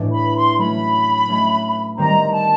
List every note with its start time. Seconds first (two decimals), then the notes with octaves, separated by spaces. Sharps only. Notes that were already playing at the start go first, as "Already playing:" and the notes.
Already playing: A2 E3 A3 D4
0.13 B5
0.35 C6
0.58 F#3 A3 C#4 B5
1.28 F#3 A3 C#4
1.97 D#3 G3 C4 A#5
2.32 A5